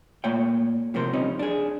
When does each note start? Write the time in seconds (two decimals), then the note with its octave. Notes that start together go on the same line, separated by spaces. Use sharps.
0.24 A#2 A3 A#3 C#5 G5
0.94 A2 C3 F3 A#4 C5
1.13 G2 C3 C#4 D#4
1.39 D4 G#4